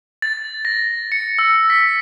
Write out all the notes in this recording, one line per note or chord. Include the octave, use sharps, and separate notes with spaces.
A6
A#6
C#7
E6
B6